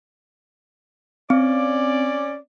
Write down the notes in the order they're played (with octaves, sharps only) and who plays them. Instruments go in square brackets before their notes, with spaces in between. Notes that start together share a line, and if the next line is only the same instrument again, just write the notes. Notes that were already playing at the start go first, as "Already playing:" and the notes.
[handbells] C4 [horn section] C#4 D5